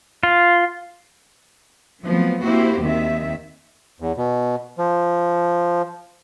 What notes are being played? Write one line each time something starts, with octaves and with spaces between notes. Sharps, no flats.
F4
F3 F#3 A3 B3 C4
A#3 C4 E4 F#4 G4 C5
D#2 D#3 C4 E5
E2
B2
F3